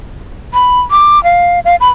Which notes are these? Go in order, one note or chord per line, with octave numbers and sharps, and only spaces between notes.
B5
D6
F5
F5
B5